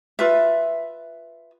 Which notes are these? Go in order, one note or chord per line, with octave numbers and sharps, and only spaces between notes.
F4 B4 E5